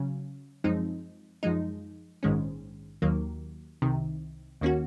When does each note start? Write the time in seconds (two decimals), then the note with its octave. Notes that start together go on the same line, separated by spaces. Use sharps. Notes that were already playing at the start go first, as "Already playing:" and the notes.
Already playing: C#3 F#3 C#4
0.64 F#2 F3 G#3 C4 D#4
1.43 F#2 F3 G#3 D#4
2.23 A#1 G#2 D#3 G#3 C#4
3.02 D#2 D#3 F#3 A#3
3.82 C2 C3 D#3
4.61 D#2 D#3 A#3 C#4 F#4